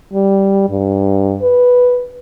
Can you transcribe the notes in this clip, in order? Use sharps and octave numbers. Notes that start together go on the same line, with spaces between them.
G3
G2
B4